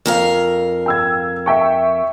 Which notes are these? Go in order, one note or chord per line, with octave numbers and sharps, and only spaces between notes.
F2 A#4 F5
G5 E6 G#6
E5 G5 C#6